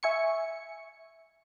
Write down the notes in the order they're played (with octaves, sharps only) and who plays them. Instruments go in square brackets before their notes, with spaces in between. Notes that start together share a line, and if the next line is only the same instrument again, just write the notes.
[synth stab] E5 G#5 C#6 C#7